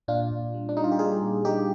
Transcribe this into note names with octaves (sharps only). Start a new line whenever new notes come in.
A#2 D4 F4
A#2
G3
D4
G3 D#4
F4
G4
G3 F4 G#4
A#2
G3 D#4 G4